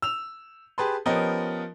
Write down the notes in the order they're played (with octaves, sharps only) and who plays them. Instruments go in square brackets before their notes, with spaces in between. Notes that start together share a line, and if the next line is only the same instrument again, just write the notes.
[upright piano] E6 F7
G4 G#4 B4 A5 C6
F3 B3 C#4 G4 A#4 D#5